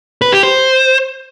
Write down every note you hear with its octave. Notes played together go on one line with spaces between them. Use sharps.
B4
G4
C5